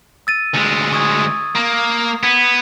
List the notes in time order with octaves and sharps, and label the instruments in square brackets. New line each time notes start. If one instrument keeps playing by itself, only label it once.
[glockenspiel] E6 A6 D#7
[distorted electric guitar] D2 G#3
[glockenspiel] C#6 D#6 G#6
[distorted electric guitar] A#3
[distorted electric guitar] B3 [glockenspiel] G#6 B6